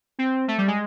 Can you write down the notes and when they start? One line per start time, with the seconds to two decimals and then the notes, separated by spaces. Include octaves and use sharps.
0.19 C4
0.48 A3
0.58 G3
0.68 G#3